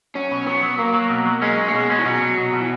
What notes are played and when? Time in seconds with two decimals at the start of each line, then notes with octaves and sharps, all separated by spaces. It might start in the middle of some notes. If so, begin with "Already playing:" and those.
0.15 F#3 C#4
0.31 B2
0.47 F#3 B3
0.62 F#3
0.78 F#3 A#3
0.94 F#3
1.10 B2
1.26 F#3
1.42 G#3 C#4
1.57 C#4
1.68 A#3
1.74 B2 G#3
1.90 C#4
1.99 E3
2.05 B2 F#3
2.21 B2
2.38 B2
2.53 B2
2.60 E3